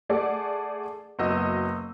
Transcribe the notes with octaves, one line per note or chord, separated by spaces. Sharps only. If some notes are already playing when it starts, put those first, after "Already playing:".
A3 G#4 D5 F#5
F#1 B3 F#4 D#5 E6